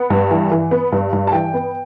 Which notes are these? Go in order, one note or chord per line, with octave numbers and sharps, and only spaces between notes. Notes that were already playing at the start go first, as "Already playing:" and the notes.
Already playing: B3 F#5
G2
E3
E3
B3
G2
G2
A5
E3 G5
B3